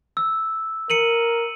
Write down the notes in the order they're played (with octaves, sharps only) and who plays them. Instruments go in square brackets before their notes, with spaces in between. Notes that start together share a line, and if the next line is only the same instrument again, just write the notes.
[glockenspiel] E6
[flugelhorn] A#4 [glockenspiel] C#7 D#7 F#7